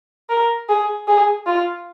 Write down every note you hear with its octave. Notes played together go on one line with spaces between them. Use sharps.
A#4
G#4
G#4
F4